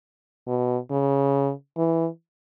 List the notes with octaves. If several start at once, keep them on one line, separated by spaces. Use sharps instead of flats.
B2
C#3
E3